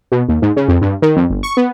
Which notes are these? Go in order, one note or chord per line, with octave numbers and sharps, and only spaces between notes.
B2
D#2
G#2
C#3
F2
G2
D#3
F2
G1
C#6
B3